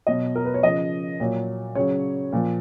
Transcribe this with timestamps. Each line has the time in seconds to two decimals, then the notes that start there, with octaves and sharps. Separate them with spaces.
0.07 B2 F#3 D#5
0.36 A#4
0.45 B4
0.54 C#5
0.63 C#3 F3 D#5
1.20 A#2 F#3
1.75 C#3 F#3 C#5
2.32 A#2 F3